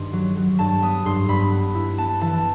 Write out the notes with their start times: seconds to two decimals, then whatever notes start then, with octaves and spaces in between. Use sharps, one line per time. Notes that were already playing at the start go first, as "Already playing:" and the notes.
Already playing: G2 D#3 C6
0.13 F#3
0.37 F#3
0.59 G2 A5
0.82 B3 D#6
1.05 G2 C6
1.28 G2 B5
1.52 B3
1.75 E4
1.98 B3 A5
2.21 E3 A5